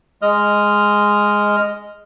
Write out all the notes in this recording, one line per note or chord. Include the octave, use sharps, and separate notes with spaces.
G#3 D#5 F6